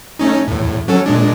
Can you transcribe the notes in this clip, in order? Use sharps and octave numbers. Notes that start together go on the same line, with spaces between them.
A3 C#4 D#4
E2 A2
F#3 C#4 A4
A#2 G#3 D4